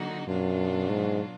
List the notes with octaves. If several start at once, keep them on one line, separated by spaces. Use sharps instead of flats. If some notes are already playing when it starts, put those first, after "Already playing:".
Already playing: D3 F#3 A#3 D#4 F#4
F#2 B2 F#3 D4 F4
G#2